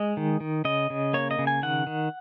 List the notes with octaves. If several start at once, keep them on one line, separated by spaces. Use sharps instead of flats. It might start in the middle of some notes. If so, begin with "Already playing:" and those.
Already playing: G#3 D#5
D#3
D#3
C#3 D#5
C#3
A#3 C#5
D#5
C#3
G#5
D#3 F#5
D#3